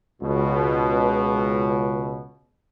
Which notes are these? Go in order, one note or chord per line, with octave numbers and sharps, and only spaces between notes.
C#2 B2